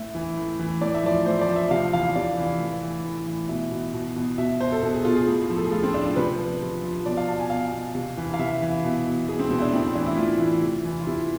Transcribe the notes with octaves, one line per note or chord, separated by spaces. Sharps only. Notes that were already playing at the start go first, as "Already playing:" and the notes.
Already playing: A2 E5
E3
A2
E3
A2 D5
E5
F3 D5
A2 C5
D5
F3
E5
C3 F5
E3 F5
C3 D5
E3
A2
E3
A2
E3
B2 E5
B2
B2
B2
B2 E5
B2 C5
A4
B2 A4
G#4
B2 F4
G#4
A2
F3
A4
G#4
A2 F4
C4
F3 D4
F4
C3 B4
F3
C3
F3
B2 D5
F5
B2 A5
G#5
B2 F5
B2
C3
E3
F5
C3 E5
E3
B2
B2
B2 G#4
C4
B2 C4
E4
D4
A2 C4
E3 D4
E4
A2 F4
E3
C3
E3
F4
C3 E4